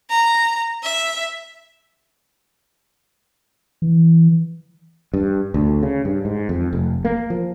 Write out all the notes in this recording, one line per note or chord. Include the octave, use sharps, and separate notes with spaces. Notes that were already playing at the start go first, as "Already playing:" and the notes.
A#5
E5
E3
G2
D2
C#3
G2
G#2
F2
F1
A#3
F3